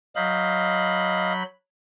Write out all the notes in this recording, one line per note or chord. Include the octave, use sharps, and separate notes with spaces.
F#3 D#5 F5 B5 G6